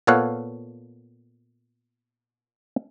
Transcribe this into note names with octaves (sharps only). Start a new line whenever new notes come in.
A#2 B3 A4 C#5 F5 F#5